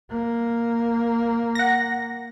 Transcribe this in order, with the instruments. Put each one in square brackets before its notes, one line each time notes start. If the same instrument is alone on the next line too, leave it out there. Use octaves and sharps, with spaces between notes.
[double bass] A#3
[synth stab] F#5 A#6